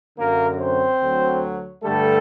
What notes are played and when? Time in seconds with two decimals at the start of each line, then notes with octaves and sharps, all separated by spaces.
0.18 F#2 D3 F#3 A#3 A#4
0.59 C4 C5
1.01 D2 D3 F#3
1.83 G2 D3 G3 A3 A4